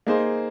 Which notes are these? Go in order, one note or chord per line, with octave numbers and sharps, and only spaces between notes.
A#3 D#4 G#4 C5